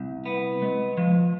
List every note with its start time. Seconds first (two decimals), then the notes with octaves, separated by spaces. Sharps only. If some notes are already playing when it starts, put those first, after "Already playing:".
Already playing: C2
0.26 B3
0.62 G#3
0.98 F3